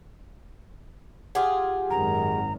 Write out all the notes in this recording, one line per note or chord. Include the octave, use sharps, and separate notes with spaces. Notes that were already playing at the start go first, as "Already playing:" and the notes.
F4 G4 G#4 F#5
G#1 F#2 D#3 A#5